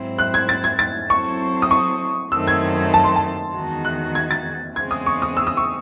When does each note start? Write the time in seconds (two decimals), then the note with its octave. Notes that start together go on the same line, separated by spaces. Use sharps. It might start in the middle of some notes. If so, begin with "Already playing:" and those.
Already playing: G#2 F#3 C4 E4 C5
0.19 F#6
0.34 G#6
0.49 A6
0.64 G#6
0.79 A6
1.10 F#3 C4 E4 A4 C5 C#6
1.62 D#6
1.71 C#6
2.31 F#2 D#3 A3 C4 E6
2.48 G#6
2.94 A5
3.04 C6
3.16 A5
3.54 E2 D#3 G#3 D#4 F#4
3.85 F#6
4.15 G#6
4.31 A6
4.76 E2 C#3 G#3 C4 G#6
4.91 D#6
5.06 C#6
5.22 D#6
5.37 E6
5.47 D#6
5.57 C#6